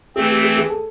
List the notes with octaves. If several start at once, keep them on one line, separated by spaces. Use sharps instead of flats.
E3 A3 C4 G#4
G4
G#4
G#4
A4